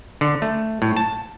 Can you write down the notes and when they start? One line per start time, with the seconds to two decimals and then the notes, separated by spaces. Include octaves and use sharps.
0.21 D3
0.42 A3
0.82 A2
0.97 A5